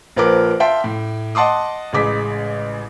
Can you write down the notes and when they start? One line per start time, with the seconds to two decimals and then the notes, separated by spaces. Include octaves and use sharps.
0.16 A#1 F3 A#4 B4 D6
0.60 E5 F5 G5 A5 C6
0.84 A2
1.35 D#5 F#5 A5 C6 D6 D#6
1.93 A1 C#3 G#3 D6 B6